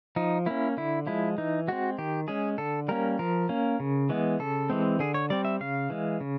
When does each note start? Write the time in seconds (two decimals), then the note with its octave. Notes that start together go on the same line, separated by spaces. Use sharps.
0.16 F3 D#4
0.46 A#3 C#4 E4
0.77 D3 E4
1.07 F3 G#3 E4
1.38 E3 D#4
1.68 G#3 C4 F#4
1.98 D#3 G4
2.28 G#3 C#4 G#4
2.58 D3 A4
2.88 G3 A#3 C#4 A#4
3.19 F3 A#4
3.49 A#3 C#4
3.80 C#3
4.09 E3 G#3 B3
4.39 C#3 A4
4.70 E3 G#3 C4
4.99 D3 G#4
5.14 C#5
5.30 G3 C4 D5
5.45 E5
5.60 C#3 F5
5.90 E3 G#3
6.20 C#3